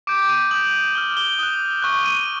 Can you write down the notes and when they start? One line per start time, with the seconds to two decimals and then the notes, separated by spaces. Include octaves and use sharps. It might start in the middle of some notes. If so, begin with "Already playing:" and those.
0.07 D6 G6 D7
0.29 D#7
0.51 D#6 G6 F#7
0.73 F#7
0.95 D6 F6 G7
1.17 G7
1.39 D#6 F#6
1.82 C#6 F#6
2.05 D#7